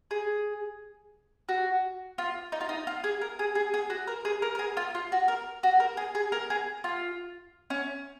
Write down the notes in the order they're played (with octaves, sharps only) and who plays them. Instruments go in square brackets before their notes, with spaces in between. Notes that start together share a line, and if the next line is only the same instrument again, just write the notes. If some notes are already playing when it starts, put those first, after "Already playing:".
[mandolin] G#4
F#4
F4
D#4
F4
D#4
F4
G#4
A#4
G#4
G#4
G#4
F#4
A#4
G#4
A#4
A#4
G#4
F4
F4
F#4
A#4
F#4
A#4
G#4
G#4
A#4
G#4
F4
C#4